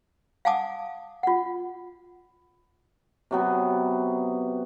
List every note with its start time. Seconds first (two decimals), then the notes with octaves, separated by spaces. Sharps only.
0.45 F5 F#5 G#5 A5 D6 D#6
1.23 F4 F#5
3.31 C3 F#3 B3